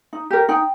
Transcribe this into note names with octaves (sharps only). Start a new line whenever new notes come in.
D#4
G4 A#4
D#4 G5